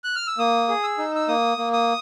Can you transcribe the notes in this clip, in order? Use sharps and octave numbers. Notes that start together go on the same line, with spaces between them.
F#6
F6
E6
A#3 D#6
G#4
E6
D#4
E6
A#3 D#6
A#3
D#6